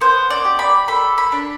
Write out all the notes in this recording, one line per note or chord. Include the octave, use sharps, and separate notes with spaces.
B3 C5
D5
G4
B5
A4 B5
B5
D4